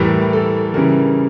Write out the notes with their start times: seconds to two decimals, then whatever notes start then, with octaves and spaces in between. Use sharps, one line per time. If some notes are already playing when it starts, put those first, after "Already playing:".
Already playing: A2 E3 G3 A#4
0.33 A4
0.74 C#3 E3 G3 A#4